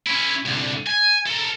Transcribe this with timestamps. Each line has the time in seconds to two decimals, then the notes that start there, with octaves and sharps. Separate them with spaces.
0.07 C#4 E4
0.45 C2 D3
0.86 G#5
1.26 A4 A#4